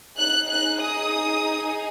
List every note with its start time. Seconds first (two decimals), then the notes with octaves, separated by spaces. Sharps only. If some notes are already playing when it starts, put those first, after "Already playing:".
0.18 D#4 G#4 F#6
0.49 F#6
0.81 D#6